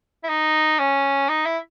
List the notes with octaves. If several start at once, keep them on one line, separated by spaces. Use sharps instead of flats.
E4
D#4
C#4
D#4
E4